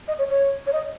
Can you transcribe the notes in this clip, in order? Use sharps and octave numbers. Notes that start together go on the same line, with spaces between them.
D#5
C#5
C#5
C#5
D#5